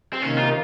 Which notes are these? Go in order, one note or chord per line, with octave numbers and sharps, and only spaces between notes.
C4
C3 D#3 A#3 C#4 D#4
F4